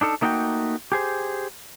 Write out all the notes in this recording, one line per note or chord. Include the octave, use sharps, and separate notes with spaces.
D4 D#4 A4
A3 A#3 D#4 F#4 C#5 G5
G4 G#4 C5